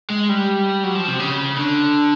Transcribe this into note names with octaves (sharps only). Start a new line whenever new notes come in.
G#3
G3
F#3
F3
C3
C#3
D3